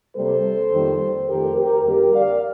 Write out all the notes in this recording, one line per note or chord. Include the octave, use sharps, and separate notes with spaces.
C3 G3 A#3 A4 C5
F2 D#3 G3 A#3
F2 D#3 A3 G4 A#4
G4 A#4
F2 D3 G3 A#3 G4 A#4
D5 F5